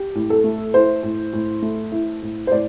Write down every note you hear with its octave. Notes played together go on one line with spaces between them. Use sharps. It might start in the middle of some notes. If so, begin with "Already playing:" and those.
Already playing: G4
A2
A4
A3
E4 C5
A2
A2
A3
E4
A2
C5
A2 D5